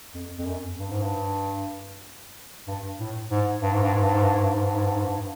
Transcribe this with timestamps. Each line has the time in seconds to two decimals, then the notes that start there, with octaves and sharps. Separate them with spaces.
0.14 F2
0.39 F2
0.46 F#2
0.77 G2
0.91 G#2
1.02 G2
2.68 G2
3.00 A2
3.31 G#2
3.62 G2
3.73 G#2
3.83 G2
3.93 G#2
4.04 G2
4.14 G#2
4.24 G2
4.34 G#2
4.44 G2
4.54 G#2
4.65 G2
4.75 G#2
4.85 G2
4.95 G#2
5.06 G2